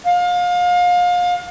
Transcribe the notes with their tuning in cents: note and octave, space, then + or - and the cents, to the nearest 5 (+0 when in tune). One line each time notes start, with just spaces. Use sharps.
F5 +30